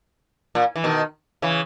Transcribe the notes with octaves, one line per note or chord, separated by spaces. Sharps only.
A#2
E3
B2 D#3
C#3 E3